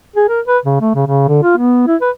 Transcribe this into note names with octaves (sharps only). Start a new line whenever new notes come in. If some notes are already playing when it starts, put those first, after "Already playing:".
G#4
A#4
B4
C#3
A3
C#3
C#3
D3
F4
B3
E4
B4